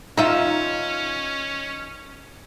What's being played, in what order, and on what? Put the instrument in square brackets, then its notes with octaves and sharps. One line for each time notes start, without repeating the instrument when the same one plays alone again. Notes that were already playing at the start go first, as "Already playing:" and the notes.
[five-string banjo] D#3 E5 [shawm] C#4 [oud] D#4 F4